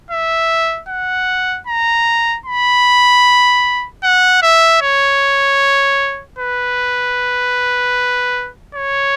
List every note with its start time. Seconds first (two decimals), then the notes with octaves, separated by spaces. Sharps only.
0.11 E5
0.89 F#5
1.67 A#5
2.46 B5
4.03 F#5
4.43 E5
4.82 C#5
6.38 B4
8.75 C#5